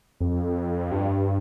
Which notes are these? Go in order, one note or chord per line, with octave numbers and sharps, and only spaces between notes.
F2
G2